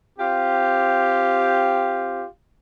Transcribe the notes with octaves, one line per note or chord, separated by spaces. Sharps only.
C4 F4 G4